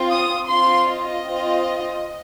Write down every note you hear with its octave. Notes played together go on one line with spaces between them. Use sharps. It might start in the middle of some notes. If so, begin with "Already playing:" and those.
Already playing: C4 F4
D#6
C4 F4 C6
D#5
C4 F4